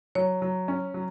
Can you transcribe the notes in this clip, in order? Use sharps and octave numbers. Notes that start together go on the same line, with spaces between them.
F#3 C#5
F#3
C#4
F#3